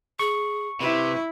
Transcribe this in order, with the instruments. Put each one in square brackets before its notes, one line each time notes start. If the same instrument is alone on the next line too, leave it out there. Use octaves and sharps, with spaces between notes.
[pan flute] G#4 [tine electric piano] C#6
[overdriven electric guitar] C3 [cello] E4 [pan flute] B4